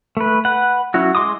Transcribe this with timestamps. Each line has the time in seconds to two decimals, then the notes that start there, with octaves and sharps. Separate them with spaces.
0.17 A3 B4
0.45 B4 F#5
0.94 F#3 C#4 E4 F#4
1.15 G#3 C6 D6 D#6